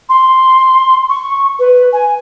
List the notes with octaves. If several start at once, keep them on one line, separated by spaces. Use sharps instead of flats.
C6
C#6
B4
G#5